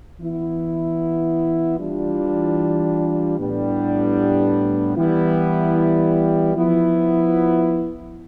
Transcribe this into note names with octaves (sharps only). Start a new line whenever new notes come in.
E3 B3 E4
E3 G3 D4 F4
A2 G3 B3 D4
E3 G3 B3 E4
F3 B3 E4